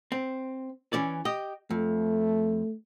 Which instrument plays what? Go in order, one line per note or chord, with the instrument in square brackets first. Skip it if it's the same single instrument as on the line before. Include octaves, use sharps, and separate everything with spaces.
[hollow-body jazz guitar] C4
E3 C#4 D5
G4 D#5
[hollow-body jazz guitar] F2 [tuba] A3